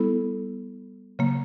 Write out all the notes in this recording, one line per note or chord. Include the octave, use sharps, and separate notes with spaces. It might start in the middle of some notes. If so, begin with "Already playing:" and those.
Already playing: G3 B3 E4 A4
C#3 F#3 A#3